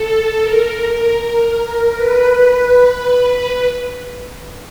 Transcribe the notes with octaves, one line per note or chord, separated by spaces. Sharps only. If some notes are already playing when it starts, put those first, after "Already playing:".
Already playing: A4
A#4
B4